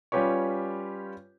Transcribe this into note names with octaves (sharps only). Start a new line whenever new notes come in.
G3 C#4 F4 G4 B4 C#5